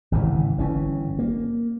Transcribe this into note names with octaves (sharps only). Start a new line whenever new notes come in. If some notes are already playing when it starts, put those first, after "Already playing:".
G#1 C#3 E3
G1 E3 C#4
A#3